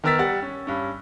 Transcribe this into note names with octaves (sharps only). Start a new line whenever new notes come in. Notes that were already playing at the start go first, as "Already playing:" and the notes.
D#3 B3 A#4 E6 A6 B6
G3 F#5 A6
C#4
G2 C#4